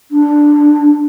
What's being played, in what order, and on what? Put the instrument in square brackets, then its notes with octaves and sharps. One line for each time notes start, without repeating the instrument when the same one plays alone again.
[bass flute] D4